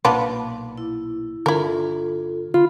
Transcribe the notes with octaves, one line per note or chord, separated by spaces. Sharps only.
B1 A#2 B3 D4 F4
E4
G1 D3 E4 F4 A4 A#4
D3 F4 B5